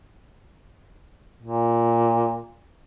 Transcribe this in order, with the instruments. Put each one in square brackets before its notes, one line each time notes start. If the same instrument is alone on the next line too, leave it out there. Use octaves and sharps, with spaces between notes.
[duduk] A#2